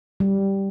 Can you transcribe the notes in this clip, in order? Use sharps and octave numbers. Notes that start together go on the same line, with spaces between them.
G3